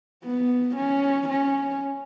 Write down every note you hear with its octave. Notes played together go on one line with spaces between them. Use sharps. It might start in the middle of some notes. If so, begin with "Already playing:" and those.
B3
C#4
C#4